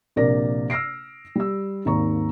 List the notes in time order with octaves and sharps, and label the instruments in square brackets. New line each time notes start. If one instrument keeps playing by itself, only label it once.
[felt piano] A#1 C3 A#3 A#4 D5 A#6
E6 F6 A#6 C7 D7
G3 E6
G#1 D#2 A#3 A#5 C#6